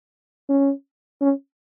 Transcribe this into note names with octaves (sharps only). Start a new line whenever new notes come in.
C#4
C#4